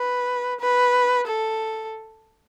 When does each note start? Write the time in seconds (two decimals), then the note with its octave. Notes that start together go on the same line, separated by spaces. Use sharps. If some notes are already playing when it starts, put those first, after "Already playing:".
Already playing: B4
0.60 B4
1.27 A4